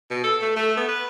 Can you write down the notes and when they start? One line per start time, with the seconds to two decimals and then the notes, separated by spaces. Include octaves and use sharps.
0.11 B2
0.24 A4
0.41 A3
0.56 A3
0.77 B3
0.88 B4